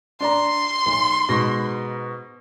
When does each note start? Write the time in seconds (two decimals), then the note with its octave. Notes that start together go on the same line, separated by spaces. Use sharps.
0.21 D4 D5 A#5 C6
0.86 B1
1.28 G#2 B2 A#6